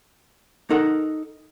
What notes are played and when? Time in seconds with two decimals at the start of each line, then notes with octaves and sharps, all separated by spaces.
0.70 D#4 A4 A#4 F#5